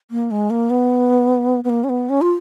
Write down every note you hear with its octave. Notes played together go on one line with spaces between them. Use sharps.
A#3
G#3
A#3
B3
B3
A#3
C#4
B3
C#4
F4